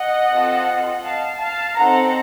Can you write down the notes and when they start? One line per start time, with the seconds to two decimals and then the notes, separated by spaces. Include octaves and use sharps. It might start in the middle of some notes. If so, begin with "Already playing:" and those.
Already playing: D#5 F#5
0.33 C4 F4 A4
1.04 F5 A5
1.40 F5 A5
1.76 C4 D#4 A4 F#5 A#5